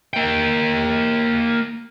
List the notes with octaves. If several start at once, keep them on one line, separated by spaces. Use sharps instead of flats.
A#3 G5